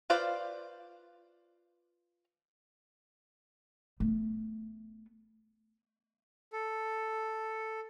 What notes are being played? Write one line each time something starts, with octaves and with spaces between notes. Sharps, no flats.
F4 B4 C5 D5 F5
A3 B3
A4